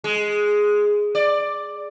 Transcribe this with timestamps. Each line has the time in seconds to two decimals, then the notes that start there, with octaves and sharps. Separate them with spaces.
0.04 G#3
1.15 D5